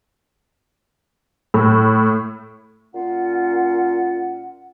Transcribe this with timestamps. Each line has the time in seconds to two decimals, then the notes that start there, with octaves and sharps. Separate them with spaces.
1.54 A2
2.94 A#2 C#4 F4 F#5